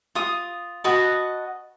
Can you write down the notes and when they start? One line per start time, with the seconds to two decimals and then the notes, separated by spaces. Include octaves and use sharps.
0.15 F4 D#6
0.84 F#4 B4 D#5 A5